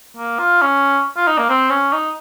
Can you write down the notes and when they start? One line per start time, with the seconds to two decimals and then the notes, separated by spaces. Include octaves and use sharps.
0.17 A#3
0.39 F4
0.62 C#4
1.17 F4
1.27 D#4
1.38 A#3
1.50 C4
1.71 C#4
1.93 D#4